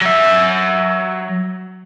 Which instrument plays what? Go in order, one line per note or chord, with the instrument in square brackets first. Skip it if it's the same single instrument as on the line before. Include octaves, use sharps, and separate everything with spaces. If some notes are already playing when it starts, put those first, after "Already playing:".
[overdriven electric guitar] F#3 E5